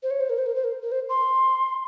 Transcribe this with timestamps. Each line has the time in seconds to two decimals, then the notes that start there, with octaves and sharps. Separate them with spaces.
0.03 C5
0.11 C#5
0.20 C5
0.30 A#4
0.38 C5
0.46 A#4
0.56 C5
0.64 A#4
0.82 A#4
0.92 C5
1.09 C6